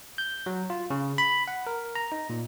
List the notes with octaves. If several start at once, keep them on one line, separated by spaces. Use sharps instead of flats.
G6
F#3
F4
C#3
B5
F#5
A#4
A#5
D#4
A#2